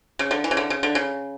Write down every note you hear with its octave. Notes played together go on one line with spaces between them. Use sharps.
C#3
D3
E3
C#3
D3
C#3
D3
C#3